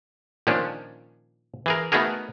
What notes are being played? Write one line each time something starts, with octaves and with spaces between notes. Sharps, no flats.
A#2 D#3 F3 C#4 D4
E3 G#4 A#4
A3 B3 D#4 F#4 G#4 A#4